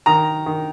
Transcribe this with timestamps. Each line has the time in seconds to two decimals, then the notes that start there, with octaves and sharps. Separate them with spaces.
0.06 D#3 A#5
0.46 D#3